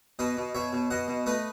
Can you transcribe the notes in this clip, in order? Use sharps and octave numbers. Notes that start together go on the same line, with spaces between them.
B2 B4 D#5
B2
B2 C#5 E5
B2
B2 D#5 F#5
B2
A3 B4 D#5